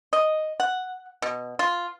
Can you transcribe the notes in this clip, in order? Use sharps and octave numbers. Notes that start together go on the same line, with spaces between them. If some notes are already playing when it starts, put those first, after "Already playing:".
D#5
F#5
B2
F4